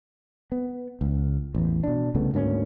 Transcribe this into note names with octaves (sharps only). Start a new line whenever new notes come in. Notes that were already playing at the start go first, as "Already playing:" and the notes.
B3
C#2
A1 E2
B2 D4
C2 C#3 A3 B3
D2 G#2 A#3 C#4